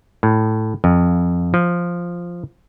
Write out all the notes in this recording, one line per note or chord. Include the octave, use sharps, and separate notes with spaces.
A2
F2
F3